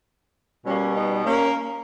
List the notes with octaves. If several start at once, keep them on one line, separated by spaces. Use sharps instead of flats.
B2 G3 A#3 C#4
B3 D#4
A#3 C#4